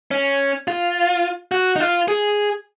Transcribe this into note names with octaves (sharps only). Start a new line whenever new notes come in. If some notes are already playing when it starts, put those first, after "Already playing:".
C#4
F4
F#4
D#4
F4
G#4